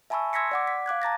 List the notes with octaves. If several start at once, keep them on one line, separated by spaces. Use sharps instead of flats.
E5 G#5 A5 B5 C#6 E6
C6 E6 G#6 A#6 B6 C#7
D5 F#5 D6
B6
F5 D6 F#6 G#6
A5 A#5 A6 A#6